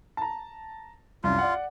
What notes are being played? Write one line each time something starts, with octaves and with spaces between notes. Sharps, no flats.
A5 A#5
C2 F#2 F4
D5 F#5